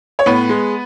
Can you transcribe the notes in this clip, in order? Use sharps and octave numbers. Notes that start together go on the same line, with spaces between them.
C#5
A2 B3 B4
G#3